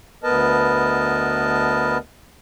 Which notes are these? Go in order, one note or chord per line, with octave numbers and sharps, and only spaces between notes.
D2 B3 A#4 B4 D#5 A5